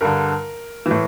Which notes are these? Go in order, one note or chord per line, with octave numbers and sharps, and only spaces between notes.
G2 D3 A#4
A2 E3